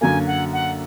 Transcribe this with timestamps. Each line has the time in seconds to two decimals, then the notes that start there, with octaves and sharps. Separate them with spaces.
0.01 F#2 D3 F#3 A#3 G#5
0.27 F#5
0.53 F#5